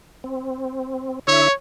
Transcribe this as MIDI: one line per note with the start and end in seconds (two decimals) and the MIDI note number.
0.24 1.19 60
1.28 1.48 50
1.28 1.48 64
1.28 1.53 73
1.28 1.48 76